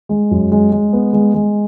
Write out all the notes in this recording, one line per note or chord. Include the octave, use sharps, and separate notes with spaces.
G#3
F#2
G#3
G#3
B3
G#3
G#3